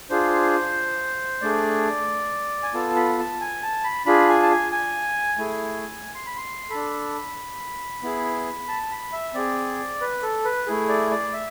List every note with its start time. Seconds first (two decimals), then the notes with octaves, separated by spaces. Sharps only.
0.10 D4 F4 G#4 C5
1.41 A3 D4 G#4 D5
2.63 G#5
2.74 B3 F4 A4 A5
2.96 B5
3.18 A5
3.41 G#5
3.63 A5
3.84 B5
4.06 D4 F4 G#4 B5
4.29 G#5
4.42 A5
4.51 G#5
4.72 G#5
5.38 A3 E4 G#4
6.15 C6
6.26 B5
6.37 C6
6.70 D4 A4 B5
8.03 B3 E4 G#4
8.68 A5
8.91 B5
9.13 E5
9.34 C4 G#4 D5
10.01 B4
10.23 A4
10.45 B4
10.67 A3 E4 G#4
10.89 D5
11.10 D5
11.33 E5